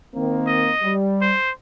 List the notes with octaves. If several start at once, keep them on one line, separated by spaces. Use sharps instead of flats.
D#3 A#3 C4
D#5
G3
C5